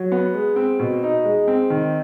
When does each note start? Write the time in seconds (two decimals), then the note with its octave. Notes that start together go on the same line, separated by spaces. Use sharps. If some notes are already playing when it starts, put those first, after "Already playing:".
Already playing: F#3
0.12 B3
0.34 G#3
0.56 C4
0.79 B2
1.03 D#4
1.25 G#3
1.48 C4
1.70 D#3